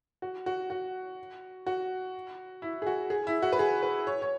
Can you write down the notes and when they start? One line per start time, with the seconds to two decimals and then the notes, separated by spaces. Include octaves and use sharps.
0.22 F#4
0.46 F#4
0.70 F#4
1.67 F#4
2.62 E4
2.82 G#4
2.87 F#4
3.10 G#4
3.27 E4
3.42 F#4
3.52 B4
3.59 G#4
3.83 B4
4.07 C#5
4.22 C#5